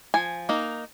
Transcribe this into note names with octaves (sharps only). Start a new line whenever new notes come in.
F3 G#5
A#3 D#4